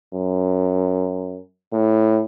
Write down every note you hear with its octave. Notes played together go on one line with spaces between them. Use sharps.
F#2
A2